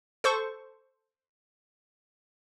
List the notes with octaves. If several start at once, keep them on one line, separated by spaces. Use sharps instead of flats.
A4 C5 C#6